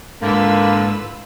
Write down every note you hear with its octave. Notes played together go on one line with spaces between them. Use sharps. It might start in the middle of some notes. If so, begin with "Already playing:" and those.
G#2 D3 A#3 E4 F4 B4 E6